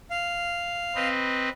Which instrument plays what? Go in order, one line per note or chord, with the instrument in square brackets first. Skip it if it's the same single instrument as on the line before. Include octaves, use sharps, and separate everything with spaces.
[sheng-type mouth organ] F5
[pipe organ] C4 B4 D#5